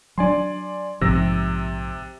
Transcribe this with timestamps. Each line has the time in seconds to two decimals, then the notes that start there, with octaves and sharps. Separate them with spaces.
0.18 F#3 D4 D5 G#5 C6
1.01 A#1 G#2 C3 F3 E6 A#6